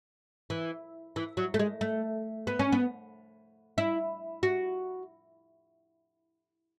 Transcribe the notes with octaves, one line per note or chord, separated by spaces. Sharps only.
E3
E3
F#3
A3
G#3
A3
B3
C#4
B3
E4
F#4